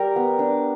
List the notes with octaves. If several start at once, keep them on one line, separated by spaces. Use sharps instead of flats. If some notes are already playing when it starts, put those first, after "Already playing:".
Already playing: G3 A#4
B3
D4